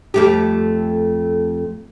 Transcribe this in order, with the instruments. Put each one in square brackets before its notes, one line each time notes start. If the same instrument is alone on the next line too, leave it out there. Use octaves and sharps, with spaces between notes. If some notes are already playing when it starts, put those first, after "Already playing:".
[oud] F2 A3 G4